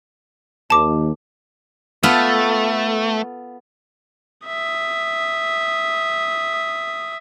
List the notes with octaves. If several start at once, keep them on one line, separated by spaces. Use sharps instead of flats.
D#2 A5 D6
A3 B3 F4 A4
E5 D#6